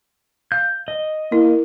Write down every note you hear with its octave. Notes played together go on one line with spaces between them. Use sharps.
F5 G6
D#5
A#3 E4